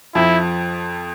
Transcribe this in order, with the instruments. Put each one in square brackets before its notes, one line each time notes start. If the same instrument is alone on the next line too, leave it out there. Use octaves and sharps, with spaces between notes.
[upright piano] F2 F3 [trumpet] E4